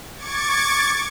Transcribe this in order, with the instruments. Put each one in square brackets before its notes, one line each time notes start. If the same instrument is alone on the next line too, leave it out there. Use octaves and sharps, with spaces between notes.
[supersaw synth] C#6 D6 G#6 A6 C#7